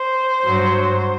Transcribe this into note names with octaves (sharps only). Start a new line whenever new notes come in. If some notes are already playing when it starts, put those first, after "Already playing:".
Already playing: C5
G2 F#3